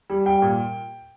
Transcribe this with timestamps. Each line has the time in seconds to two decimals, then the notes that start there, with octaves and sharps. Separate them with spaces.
0.10 G3
0.26 G3 G5
0.42 A#2